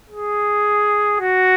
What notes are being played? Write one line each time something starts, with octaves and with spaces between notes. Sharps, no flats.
G#4
F#4